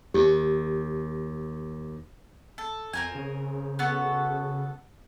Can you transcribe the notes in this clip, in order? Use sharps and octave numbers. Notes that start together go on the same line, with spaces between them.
D#2 G4
A4
F2 C4 A#4 G#5
C#3
B3 F#4 A4